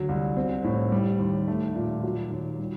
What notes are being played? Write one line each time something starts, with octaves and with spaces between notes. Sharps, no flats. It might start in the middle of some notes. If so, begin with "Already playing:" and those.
Already playing: D2 F#3
C2
C4
A2
G3
D#2
A3
A#2
F#3
D#2
G3